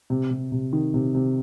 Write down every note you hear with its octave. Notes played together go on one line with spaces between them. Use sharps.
C3
C3
C3
D#3
C3
C3